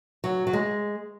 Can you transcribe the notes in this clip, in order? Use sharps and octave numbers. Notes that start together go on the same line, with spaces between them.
F#3
F#3
G#3